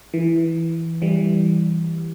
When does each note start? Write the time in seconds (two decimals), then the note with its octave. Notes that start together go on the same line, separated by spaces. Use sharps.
0.14 E3
1.02 E3 G3